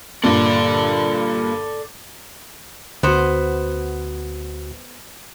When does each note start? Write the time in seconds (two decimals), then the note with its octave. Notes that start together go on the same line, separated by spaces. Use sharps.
0.24 G2 A#2 A4 D5
3.03 D2 B3 F#4 C5